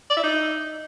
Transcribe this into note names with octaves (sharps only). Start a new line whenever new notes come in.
D5
E4
D#4